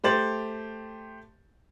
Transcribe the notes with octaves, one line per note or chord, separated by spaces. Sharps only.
A3 G4 C5 A6 F#7